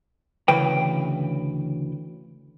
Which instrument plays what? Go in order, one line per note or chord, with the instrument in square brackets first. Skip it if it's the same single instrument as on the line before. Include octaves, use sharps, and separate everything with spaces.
[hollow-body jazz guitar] D2 C#3 E3 B4 G5